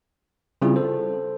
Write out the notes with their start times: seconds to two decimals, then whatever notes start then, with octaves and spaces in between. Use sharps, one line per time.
0.62 C#3 G3 C4 E4 F4 G#4
0.76 A4 C5